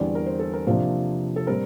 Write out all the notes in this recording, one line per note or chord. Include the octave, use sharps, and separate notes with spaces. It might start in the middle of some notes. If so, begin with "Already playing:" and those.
Already playing: E2 D3 G3 C4 D5
A#4
C5
A4
A#4
C3 F3 A#3 D4 C5
A4
G3 C4 A#4